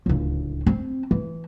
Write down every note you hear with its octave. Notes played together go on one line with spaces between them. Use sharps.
D1 C#2
C4
E3